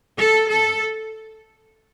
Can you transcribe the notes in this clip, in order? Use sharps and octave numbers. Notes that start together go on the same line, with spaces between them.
A4
A4